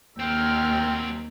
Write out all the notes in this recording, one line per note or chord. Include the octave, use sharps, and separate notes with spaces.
D#2 F#3 C4 G5 E6 F6